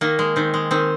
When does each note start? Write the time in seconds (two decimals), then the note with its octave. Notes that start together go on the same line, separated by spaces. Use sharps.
0.01 D#3 A#3
0.19 G#3
0.36 D#3 C4
0.54 G#3
0.71 D#3 C4